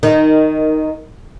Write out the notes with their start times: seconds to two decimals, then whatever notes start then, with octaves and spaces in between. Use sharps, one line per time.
0.03 D#3